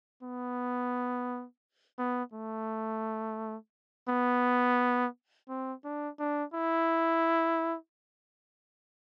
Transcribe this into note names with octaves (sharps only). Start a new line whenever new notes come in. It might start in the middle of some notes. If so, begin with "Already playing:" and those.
B3
B3
A3
B3
C4
D4
D4
E4